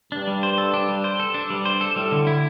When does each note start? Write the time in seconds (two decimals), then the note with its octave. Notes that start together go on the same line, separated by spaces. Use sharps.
0.12 G2 D4
0.27 G3
0.43 C5
0.58 A4
0.74 D4
0.88 G3
1.04 C5
1.20 A4
1.34 D4
1.50 G2 G3
1.65 C5
1.81 A4
1.96 A2 G3
2.12 D3
2.27 E4